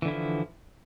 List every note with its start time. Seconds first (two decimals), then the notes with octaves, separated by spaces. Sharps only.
0.02 E3
0.05 D3
0.08 E4
0.11 F3